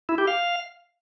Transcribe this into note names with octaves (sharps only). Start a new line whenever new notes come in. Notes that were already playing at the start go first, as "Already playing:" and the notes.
E4
G4
F5